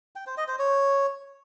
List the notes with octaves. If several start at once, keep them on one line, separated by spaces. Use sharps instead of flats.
G5
C5
D#5
C5
C#5